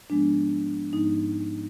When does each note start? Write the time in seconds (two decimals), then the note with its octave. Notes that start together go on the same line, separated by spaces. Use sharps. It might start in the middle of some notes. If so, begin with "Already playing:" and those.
0.09 G#2 F3 G#3 B3 D4
0.93 G#2 F3 G#3 B3 D#4